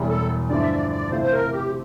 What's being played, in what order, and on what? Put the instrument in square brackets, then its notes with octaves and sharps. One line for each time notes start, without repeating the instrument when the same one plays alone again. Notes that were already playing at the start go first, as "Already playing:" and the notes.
Already playing: [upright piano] E1 E2 E3 G3
[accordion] A4
[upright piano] G2 D3 F3 A3 E4 [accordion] D5
[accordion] E5
D5
D5
[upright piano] C3 E3 A3 C4 F4 [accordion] C5
[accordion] C5
A#4
G4